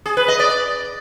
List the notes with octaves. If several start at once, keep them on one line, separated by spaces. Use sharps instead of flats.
G#4
B4
D#5
D5